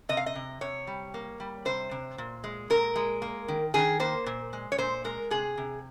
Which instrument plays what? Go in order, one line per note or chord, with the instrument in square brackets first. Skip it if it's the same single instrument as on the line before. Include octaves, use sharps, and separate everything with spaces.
[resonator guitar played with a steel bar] C3 D#5
F5
D#5
C3
C3 C#5
G3
A#3
G3
C3 C5
C3
A#2
G#3
A#2 A#4
G#3
A#3
D#3
D#3 G#4
A#3 C5
A#2
G#3
C#5
A#2 C5
G#3 A#4
C3 G#4
C3